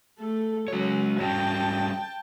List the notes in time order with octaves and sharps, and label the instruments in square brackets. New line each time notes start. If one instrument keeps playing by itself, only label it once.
[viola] A3 A4
[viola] F#3 C#4 [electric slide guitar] G#3 C#5
[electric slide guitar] G3 C#4 F#4 [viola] G5 A5